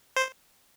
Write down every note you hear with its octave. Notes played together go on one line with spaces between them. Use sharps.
C5